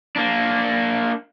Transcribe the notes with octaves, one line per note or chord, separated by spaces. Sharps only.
A#3 D4